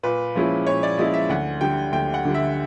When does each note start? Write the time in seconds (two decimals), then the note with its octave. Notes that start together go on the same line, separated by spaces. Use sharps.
0.03 A#2 B4
0.35 F3 G#3 C#4 E4
0.67 A#2 C#5
0.83 D5
0.98 F3 G#3 C#4 E4 D#5
1.14 E5
1.29 D2 F#5
1.61 D3 G3 G5
1.92 D2 G5
2.14 F#5
2.25 D3 G3
2.34 E5